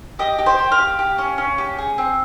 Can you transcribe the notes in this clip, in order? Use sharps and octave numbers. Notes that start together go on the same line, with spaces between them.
G4 D#5
G4
C5
G4
F5
G4
G4
C#4
C#4
G4
G#4
C4